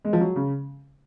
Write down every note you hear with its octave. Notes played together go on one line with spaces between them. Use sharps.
G#3
F3
F#3
C#3